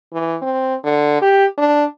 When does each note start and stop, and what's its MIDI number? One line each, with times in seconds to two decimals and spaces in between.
0.13 0.37 52
0.42 0.75 60
0.84 1.18 50
1.22 1.46 67
1.58 1.85 62